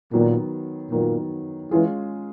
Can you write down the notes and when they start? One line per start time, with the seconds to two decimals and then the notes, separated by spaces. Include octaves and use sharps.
0.13 A#2 D#3 F#3 B3
0.92 A#2 D#3 F#3 B3
1.71 E3 G#3 C#4 F4 G#4